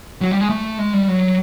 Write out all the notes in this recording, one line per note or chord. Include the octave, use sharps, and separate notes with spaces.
F#3
G3
G#3
A3
G#3
G3
F#3